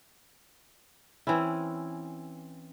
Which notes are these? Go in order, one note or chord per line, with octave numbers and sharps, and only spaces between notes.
E3 C4 C#4 E4